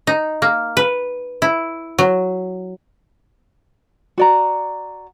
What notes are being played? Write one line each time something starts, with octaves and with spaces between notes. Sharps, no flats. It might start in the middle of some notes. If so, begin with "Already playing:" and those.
D#4
A#3
B4
E4
F#3
F#4 D5 A#5